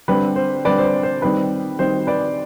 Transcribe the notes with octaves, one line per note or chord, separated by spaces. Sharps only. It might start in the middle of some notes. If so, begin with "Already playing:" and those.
D3 G3 C4 B4
C5
D3 G3 C4 B4 D5
C5
B4
C5
D#3 G3 C4 D#4 B4
D#3 G3 C4 D#4 C5
B4 D5